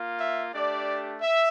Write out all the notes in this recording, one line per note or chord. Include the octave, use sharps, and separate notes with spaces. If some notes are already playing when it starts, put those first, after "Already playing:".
Already playing: A#3 F4
E5
A3 D4 G4 D5
E5